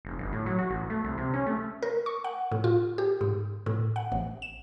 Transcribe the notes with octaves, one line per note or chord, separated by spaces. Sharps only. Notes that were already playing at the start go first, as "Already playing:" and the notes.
F1
G1
A2
F#3
F#4
A1
A3
C2
C3
C#4
A3
A#4
C#6
F#5
A2
F4
G4
G#2
A2
F#5
A1
E7